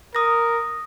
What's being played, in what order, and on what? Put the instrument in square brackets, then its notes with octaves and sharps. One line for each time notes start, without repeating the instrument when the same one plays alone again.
[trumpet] A#4 [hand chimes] D#6 A#6